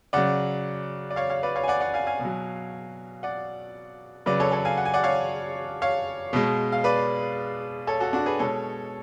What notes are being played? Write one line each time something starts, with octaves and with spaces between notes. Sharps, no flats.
C#3 F#3 D5 F#5
D5
C#5 F5
C#5 F5
B4 D5
C#5 F5
G#5
D5 F#5
D5 F#5
F5 G#5
F5 G#5
B2
F#3
D5 F#5
C#3 F#3 B4 D5
A4 C#5
A4 C#5
F5 G#5
F#5
G#5
D5 F#5
C#5 F5
C#5 F5
B2 G#3
F5
B4 D5
A4 C#5
F#4 A4
D4 F#4
G#4 B4
B2 G#3 A4 C#5